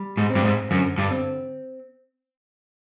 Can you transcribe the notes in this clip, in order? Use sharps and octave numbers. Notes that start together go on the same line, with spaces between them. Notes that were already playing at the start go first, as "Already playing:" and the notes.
Already playing: G3
G#2
C4
G2
G#2
F#2 D3
G2
C4